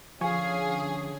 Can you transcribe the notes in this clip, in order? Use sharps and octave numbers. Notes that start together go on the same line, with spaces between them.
D3 F3 C#4 G#4 F5 G#5 C#6